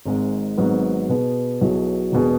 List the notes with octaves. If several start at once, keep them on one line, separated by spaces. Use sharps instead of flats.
G#1 G#2 G#3
G#1 G#2 F#3 B3 F#4
B2 B3 G#4
B1 B2 F#3 E4 G#4
E1 E2 B2 B3 G#4